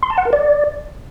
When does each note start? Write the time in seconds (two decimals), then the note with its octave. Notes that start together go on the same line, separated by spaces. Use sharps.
0.03 C6
0.10 A5
0.18 F#5
0.25 A#4
0.33 D5